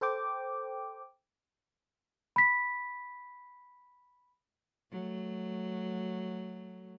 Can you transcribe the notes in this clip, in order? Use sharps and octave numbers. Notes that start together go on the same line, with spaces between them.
A4 C5 G5 D6
B5 B6
F#3 A3